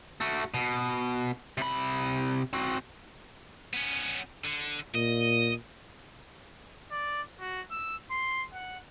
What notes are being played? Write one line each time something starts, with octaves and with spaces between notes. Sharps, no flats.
A3 F#4
B2
C3 B5
C4 F#4
B3 C#4
D3
A#2 D#5
D5
F#4
E6
C6
F#5